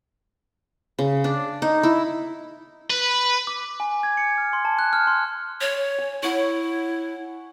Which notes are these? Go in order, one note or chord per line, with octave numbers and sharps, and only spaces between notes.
C#3
D4
D#4
E4
B4
D6
G#5
G#6
C#7
F6
C6
A5
F#6
F6
C6
C#5
G#5
E4 C#5 F#5